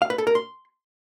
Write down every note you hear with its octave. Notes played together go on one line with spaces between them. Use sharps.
F5
B4
A4
A#4
C6